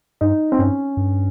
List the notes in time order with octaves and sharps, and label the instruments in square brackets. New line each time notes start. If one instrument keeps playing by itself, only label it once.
[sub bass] G2 [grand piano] D#4
[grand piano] C4
[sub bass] G2 [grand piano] C#4
[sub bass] G2